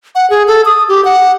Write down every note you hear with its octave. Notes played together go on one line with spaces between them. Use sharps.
F#5
G#4
A4
D#6
G4
F#5